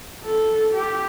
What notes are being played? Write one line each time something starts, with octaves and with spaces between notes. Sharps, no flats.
A4
G4